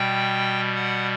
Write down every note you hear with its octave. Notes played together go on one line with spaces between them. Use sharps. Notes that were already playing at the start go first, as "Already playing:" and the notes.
Already playing: B2 G3 G5
F#5